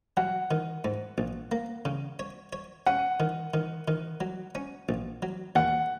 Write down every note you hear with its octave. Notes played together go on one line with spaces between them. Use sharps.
F#3 F#5
D#3
G#2
A#1
A#3
C#3
C#5
C#5
C#4 F#5
D#3
D#3
D#3
F#3
C#4
A#1
F#3
D#2 F#5